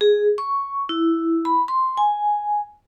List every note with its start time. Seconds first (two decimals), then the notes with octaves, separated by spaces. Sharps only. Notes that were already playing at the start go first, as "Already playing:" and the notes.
0.01 G#4
0.38 C#6
0.89 E4
1.45 B5
1.68 C6
1.97 G#5